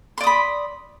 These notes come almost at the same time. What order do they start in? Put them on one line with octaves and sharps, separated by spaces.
C6 D5 D#6 B5